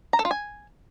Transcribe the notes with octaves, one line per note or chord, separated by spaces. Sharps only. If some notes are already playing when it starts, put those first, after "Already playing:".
A#5
A4
F4
G#5